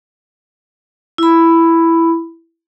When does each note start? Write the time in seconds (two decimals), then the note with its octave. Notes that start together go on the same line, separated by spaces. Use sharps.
1.18 E4 B5